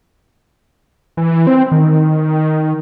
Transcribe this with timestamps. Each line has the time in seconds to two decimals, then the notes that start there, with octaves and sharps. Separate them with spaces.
1.17 E3
1.47 C4
1.72 D#3